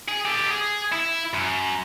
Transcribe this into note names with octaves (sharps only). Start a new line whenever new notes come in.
G#4
G4 A4
G#4
E4
F#2